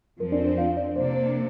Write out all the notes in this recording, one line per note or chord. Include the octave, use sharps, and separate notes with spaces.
F2 F3 C4 A#4
D4 D5
C5
F4 F5
D4 D5
C3 A#3 D4 C5
C5